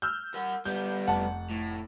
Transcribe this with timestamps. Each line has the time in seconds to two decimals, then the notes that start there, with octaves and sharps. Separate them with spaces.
0.02 E6 F6 G6
0.34 A#4 F#5
0.65 G3 B3 G6
1.07 F1 F#5 A5
1.50 A2